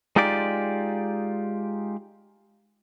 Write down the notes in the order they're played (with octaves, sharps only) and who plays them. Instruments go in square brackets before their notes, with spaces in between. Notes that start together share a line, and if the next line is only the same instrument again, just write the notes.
[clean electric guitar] G#3 D#4 F4 G4 D5